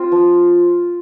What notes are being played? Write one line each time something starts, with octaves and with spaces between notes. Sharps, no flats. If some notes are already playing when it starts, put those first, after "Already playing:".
Already playing: C4 F4 C5
F3